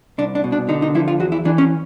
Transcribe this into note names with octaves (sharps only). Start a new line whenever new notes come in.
C2 D4
D4
B2
D4
D3 D#4
D#4
F3 E4
F4
E2 F#4
E4
E3 D4
C#4